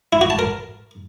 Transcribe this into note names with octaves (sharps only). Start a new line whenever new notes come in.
E4
F#4
A5
A#4